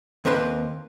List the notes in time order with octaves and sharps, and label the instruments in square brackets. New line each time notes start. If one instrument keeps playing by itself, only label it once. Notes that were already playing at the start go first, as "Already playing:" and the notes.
[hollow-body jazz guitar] D#2 C4 A#4 B4 A5 C6